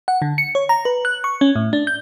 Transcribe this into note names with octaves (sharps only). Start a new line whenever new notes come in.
F#5
D3
C#7
C#5
A#5
B4
F#6
C#6
C#4
A2
D4
G6